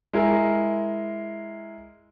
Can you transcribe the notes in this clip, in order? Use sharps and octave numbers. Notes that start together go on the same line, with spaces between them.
G#3 E4 A#4